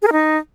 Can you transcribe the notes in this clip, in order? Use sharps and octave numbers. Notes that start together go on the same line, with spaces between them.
G#4
A#4
D#4